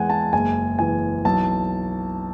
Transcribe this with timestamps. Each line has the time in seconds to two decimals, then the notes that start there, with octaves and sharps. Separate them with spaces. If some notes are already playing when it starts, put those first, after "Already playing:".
Already playing: E2 G#3 F#5 G#5
0.10 A5
0.33 F#1 G#5
0.79 E3 G#5
1.25 B1 A5